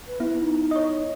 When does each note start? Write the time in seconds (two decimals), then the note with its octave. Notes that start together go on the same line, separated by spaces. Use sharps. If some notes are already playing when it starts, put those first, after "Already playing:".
0.07 B4
0.20 B3 E4
0.39 D#4
0.71 C#5 D#5